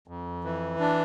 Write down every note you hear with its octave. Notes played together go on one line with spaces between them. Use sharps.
F2
E3
D4